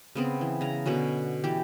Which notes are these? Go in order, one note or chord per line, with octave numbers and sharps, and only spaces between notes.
C#3 B3 C4
E3
C#3 A#5
B2 D3 C#4 F#4
E3 G4